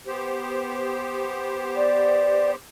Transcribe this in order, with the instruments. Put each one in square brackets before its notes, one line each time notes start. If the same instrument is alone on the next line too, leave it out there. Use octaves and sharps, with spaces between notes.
[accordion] B3 G4 C5
[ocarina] D5